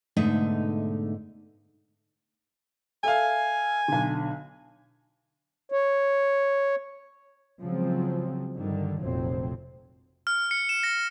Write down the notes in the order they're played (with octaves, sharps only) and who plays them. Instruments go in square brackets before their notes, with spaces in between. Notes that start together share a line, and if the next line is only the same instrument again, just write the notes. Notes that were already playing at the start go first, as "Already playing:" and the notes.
[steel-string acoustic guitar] G#2 B2 D3 A3 D#4 E5
[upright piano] A4 E5 F5 [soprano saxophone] G#5
[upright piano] B1 D3
[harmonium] C#5
[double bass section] C#3 F3 F#3 G#3 C4
G2 D3 D#3 G3
F1 A#1 A#2 F3 F#3 C4
[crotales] F6
C#7
E7
A#6